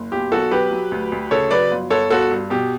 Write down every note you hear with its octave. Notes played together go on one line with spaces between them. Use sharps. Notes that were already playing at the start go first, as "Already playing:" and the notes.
Already playing: F#1
B1 G4
B1 F#4 A4
F#3 G4 B4
F#3
D2
D2
C#3 A4 C#5
F#3 B4 D5
G1
G1 A4 C#5
G1 F#4 A4
G2
B2 G4